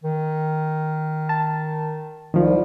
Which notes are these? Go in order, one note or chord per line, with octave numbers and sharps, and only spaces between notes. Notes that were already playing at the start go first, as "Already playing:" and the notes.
D#3
A5
C2 D#3 F3